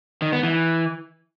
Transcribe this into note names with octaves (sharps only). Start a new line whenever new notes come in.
D#3
B3
E3